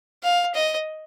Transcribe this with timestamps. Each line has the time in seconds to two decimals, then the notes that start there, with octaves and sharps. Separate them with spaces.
0.23 F5
0.55 D#5